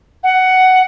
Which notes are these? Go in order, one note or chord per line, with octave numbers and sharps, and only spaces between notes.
F#5